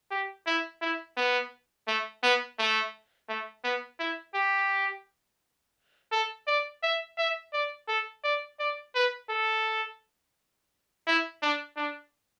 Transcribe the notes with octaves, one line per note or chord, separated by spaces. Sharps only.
G4
E4
E4
B3
A3
B3
A3
A3
B3
E4
G4
A4
D5
E5
E5
D5
A4
D5
D5
B4
A4
E4
D4
D4